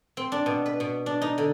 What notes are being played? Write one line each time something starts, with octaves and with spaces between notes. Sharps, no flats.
C4
D4
B2
B4
B2
D4
D#4
D3